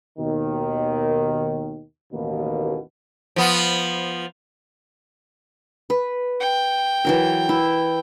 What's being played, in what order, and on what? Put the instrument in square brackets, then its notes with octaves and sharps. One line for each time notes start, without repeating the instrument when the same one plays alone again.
[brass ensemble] D#2 B2 D#3
A1 D#2 B2 A#3
[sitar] F3 B3
[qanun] B4
[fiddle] G5
[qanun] E3 F#3 A#4
E4